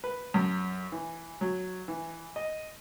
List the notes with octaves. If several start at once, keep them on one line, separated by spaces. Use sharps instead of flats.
B4
F#2
E3
F#3
E3
D#5